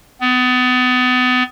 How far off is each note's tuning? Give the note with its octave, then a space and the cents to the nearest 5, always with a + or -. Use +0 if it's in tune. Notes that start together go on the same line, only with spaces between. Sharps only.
B3 +30